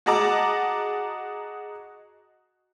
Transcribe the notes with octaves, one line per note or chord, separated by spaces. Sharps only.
F#4 G#4 D#5 A5 A#5 D6